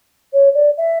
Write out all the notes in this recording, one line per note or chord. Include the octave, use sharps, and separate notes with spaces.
C#5
D5
E5